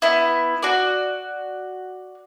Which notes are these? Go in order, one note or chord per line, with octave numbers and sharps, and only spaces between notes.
B3 E4
F#4 D5